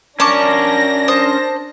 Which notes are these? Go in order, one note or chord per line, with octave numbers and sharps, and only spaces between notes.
C#4 D4 A#4 A5 C#6 D6 A#6
C5 A5 D#6